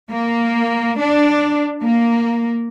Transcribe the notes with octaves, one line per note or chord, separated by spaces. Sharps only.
A#3
D4
A#3